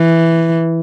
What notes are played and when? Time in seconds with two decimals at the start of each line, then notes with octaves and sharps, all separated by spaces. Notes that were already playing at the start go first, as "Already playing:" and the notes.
Already playing: E3